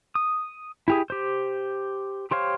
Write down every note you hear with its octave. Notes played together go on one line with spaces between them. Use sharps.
D#6
E4 G4 G#4
G4 C5
G4 C5 C#5 F5